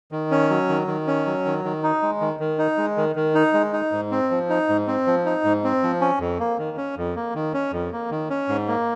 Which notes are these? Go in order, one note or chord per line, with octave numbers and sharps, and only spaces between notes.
D#3
C#4
F#3
D#3
D#3
C#4
F#3
D#3
D#3
D#4
G#3
D#3
D#3
D#4
G#3
D#3
D#3
D#4
G#3
D#4
G#2
C4
F3
D#4
G#2
C4
F3
D#4
G#2
C4
F3
C#4
F2
A#3
D#3
C#4
F2
A#3
D#3
C#4
F2
A#3
D#3
C#4
G#2
A#3